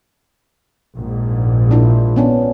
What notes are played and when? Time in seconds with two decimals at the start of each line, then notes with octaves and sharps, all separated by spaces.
0.97 A#1 G#2
1.71 D4 E4 F4
2.16 B3 C#4 D4